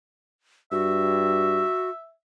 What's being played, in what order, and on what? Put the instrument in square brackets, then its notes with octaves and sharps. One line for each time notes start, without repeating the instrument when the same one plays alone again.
[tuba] G2 [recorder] F#4 [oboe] E5